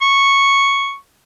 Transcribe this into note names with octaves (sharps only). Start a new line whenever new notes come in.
C#6